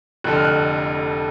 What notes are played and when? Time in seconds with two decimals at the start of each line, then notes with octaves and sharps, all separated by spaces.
0.24 F1 F2 D3 F#6
0.35 F6
0.44 F#6